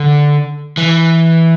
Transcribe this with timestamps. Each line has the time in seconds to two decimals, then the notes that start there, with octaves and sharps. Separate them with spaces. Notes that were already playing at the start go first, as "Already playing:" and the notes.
Already playing: D3
0.77 E3